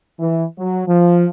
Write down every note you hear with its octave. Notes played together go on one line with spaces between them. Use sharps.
E3
F#3
F3